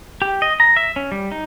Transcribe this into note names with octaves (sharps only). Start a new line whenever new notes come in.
G4
D#5
A#5
E5
C#4
G3
D#4